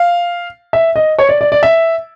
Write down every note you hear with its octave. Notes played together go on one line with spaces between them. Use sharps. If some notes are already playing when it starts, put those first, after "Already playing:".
Already playing: F5
E5
D#5
C#5
D5
D5
D5
E5